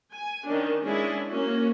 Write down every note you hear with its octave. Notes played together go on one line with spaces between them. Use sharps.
G#5
D#3 C#4 D4
G#3 C#4 D4 E4 G#4
A#3 C#4 F#4